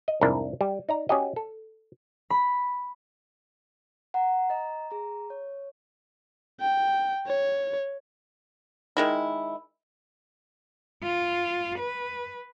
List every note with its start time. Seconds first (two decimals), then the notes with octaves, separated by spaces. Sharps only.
0.08 D#5
0.21 C2 F2 G#2 D4 E4 A#4
0.61 G3
0.89 D#4 D5 A#5
1.09 C#4 F#4 G4 D#5
1.36 A4
2.30 B5
4.14 F#5 A#5
4.50 D#5 A#5
4.91 G#4 A#5
5.30 C#5
6.61 G5
7.27 C#5
8.97 D#3 G#3 E4
11.03 F4
11.79 B4